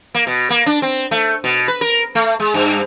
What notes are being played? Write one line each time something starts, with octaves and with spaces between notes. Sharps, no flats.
A#3
B2
A#3
D4
C4
A3
B2
B4
A#4
A3
G#3
G2